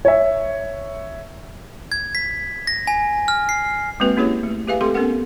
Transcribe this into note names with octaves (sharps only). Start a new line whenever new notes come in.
C#5 E5
G#6
B6
A#6
G#5
F6
C7
G#3 A#3 C4 F#4 B4
A#3 C#4 E4 G4 G#4 C#5
A3
G4 G#4 B4 E5 F5 G#5
A3 C4 G4 A4 C6
B3 C#4 A4 A#4 F#5